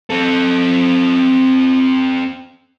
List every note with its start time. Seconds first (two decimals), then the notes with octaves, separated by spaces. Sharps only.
0.10 C4 A4